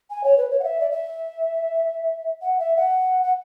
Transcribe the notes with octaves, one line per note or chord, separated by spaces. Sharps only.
G#5
C#5
B4
C#5
F#5
E5
D5
E5
F#5
E5
F#5
F#5